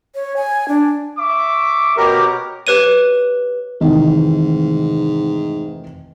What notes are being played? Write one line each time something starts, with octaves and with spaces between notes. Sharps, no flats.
C#5
G#5
D4
E5 C#6 D6
B2 B3 G4 A#4 C#5
G4 B4 C#5 D#7
F1 G#2 D#3 E3